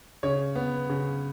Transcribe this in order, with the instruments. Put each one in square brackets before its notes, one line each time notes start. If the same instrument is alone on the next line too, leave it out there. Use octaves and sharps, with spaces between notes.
[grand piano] C#3 C#5
B3
C#3